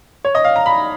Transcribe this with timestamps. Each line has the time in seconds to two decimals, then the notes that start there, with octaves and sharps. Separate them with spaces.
0.25 C#5
0.35 D#5
0.44 F5
0.56 A#5
0.66 B5